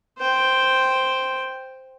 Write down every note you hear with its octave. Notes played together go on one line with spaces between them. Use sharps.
C5 G5